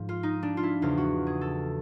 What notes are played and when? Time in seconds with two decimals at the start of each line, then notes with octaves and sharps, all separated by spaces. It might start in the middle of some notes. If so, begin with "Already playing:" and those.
Already playing: G#2 F3
0.09 F4
0.23 D#4
0.43 D4
0.57 F4
0.63 E4
0.82 E2 C#3 F3 F4
0.97 F#4
1.27 G#4
1.41 A4